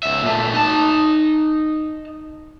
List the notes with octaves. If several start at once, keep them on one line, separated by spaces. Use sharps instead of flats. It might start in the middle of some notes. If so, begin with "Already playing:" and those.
C#2 E5
A#2 A3
D#4 A5